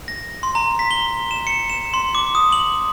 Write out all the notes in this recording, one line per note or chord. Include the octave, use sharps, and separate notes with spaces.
A#6
C6
A#5
B6
G7
E7
C#7
E7
C6
D6
D#6
F#7